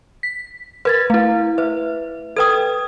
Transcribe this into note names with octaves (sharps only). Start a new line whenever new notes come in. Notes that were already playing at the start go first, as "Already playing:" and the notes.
B6
A#4 B4 G#6 A6
A3 E4 F5
B4 E5
A4 B4 G5 D#6 G#6